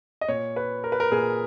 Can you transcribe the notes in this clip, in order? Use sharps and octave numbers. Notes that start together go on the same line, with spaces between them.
D#5
A#2 C#5
B4
A#4
B4
A#4
A#2 G#4